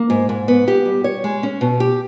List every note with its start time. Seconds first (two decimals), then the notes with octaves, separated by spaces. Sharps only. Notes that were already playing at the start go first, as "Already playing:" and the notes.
Already playing: A#3
0.10 G#2
0.29 G#2
0.48 B3
0.68 G4
0.85 G3
1.04 C#5
1.24 G#3
1.43 C#4
1.61 B2
1.80 G4